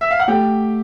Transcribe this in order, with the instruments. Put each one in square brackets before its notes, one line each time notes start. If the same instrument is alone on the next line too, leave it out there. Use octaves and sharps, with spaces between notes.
[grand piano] E5
F5
F#5
[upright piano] A3 [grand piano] G4 G5